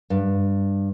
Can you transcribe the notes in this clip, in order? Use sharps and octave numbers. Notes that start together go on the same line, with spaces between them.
G2